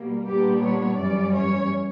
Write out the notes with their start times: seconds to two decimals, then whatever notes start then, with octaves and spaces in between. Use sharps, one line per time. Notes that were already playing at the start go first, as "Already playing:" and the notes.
Already playing: B2 G3 A#3
0.27 A#2 G3 B3 D4 G4
0.63 C#5
0.99 F#2 E3 G3 C#4 D5
1.36 C#5